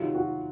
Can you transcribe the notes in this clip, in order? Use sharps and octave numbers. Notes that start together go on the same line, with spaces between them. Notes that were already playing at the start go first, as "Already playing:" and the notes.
Already playing: C3 D#3 F#3 F4
F#4